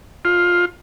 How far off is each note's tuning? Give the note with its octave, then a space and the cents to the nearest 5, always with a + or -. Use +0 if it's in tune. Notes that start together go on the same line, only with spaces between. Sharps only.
F4 +10